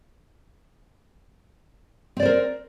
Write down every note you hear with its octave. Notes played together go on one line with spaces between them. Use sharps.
C4 A#4 C5 D5